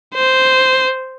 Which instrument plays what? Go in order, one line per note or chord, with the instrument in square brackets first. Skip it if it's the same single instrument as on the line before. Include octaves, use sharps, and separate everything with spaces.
[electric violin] C5